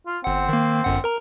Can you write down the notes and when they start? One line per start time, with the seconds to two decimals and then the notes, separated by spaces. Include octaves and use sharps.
0.07 F4
0.24 G1 C4 F#5
0.49 D#3 A#3
0.84 G1 F#2 F#5
1.04 A#4 A#5